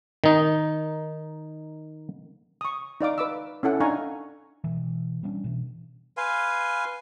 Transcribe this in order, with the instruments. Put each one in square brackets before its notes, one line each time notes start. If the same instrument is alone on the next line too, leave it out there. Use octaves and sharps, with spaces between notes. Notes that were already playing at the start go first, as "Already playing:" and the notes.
[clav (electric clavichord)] D#3 D#4
[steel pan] C#6 D#6
D#4 D5 F5 D6
B4 D6 E6
C#4 E4 A4 F#5
D4 D#4 F5 G#5 A#5 C#6
[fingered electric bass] B2 E3
G3 B3 C#4 D4
B2 E3
[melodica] B4 F5 G#5 C6